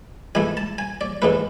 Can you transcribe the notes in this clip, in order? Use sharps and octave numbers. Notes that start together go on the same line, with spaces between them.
G#2 E3 A3 G#5
A5
G#5
D5
G#2 E3 A3 B4